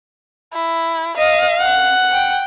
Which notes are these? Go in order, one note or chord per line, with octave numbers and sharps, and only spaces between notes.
E4
D#5 F5
F#5
G5